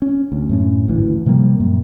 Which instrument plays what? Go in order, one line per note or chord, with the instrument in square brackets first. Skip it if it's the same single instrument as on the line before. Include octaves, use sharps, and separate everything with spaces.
[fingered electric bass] C#4
D2
F#2 A2 C#4
G#1 D2 E3
C3 F3 G3 A#3
F#2 A#2